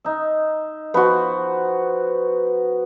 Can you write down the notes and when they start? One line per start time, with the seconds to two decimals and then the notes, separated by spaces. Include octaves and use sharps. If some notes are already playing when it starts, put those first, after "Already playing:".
0.04 D#4 E5
0.94 F3 B3 F#4 C6